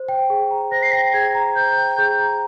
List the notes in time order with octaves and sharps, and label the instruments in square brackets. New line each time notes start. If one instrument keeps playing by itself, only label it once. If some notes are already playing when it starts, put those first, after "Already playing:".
Already playing: [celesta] C5
G5
G#4
A#5
[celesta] C5 [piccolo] A#6
[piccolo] C7
[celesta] G5 [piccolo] A#6
[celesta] G#4 [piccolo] G#6
[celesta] A#5
[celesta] C5 [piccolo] G6
[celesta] G5
G#4
A#5